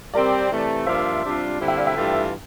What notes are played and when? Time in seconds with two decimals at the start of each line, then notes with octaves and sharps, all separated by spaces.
0.14 C3 G3 C4 A#4 D5
0.50 C3 E3 A3
0.87 G2 F3 A#3 D4 F4 C5 E5
1.23 C3 G3 D4 F4
1.59 D3 G3 C4 E4
1.68 E5 G5
1.77 D5 F5
1.86 E5 G5
1.95 G2 E3 A3 D4 F4